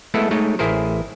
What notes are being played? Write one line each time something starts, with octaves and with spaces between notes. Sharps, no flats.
G#3 A3 B3 E4 A4
G#3 A3 D#4 C#5
A1 E4 G#4 A#4 C5